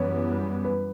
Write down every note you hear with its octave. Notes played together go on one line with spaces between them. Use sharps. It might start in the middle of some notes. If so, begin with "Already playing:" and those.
Already playing: F#2 E3 G3 B3 C#5
B4